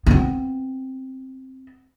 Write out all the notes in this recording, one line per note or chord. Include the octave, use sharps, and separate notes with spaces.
B3 C4